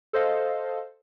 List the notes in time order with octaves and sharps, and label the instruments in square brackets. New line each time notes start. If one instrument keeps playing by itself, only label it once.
[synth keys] A4 C5 D#5 F5